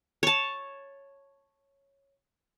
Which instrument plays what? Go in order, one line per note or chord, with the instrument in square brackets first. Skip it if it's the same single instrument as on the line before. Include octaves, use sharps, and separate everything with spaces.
[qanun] C#5 A5